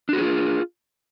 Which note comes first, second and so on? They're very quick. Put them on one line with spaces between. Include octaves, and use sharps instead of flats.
D4 F#4 G#4 F4